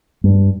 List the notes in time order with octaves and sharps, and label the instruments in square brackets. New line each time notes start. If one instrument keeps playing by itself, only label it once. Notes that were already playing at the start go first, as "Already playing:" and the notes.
[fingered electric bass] G2